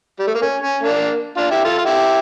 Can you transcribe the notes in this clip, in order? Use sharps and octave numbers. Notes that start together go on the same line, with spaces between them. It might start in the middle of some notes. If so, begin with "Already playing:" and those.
G3
A3
A#3
C#4
C#4
A#3 D4
D4 F4
E4 G4
F4 A4
F4
E4 G4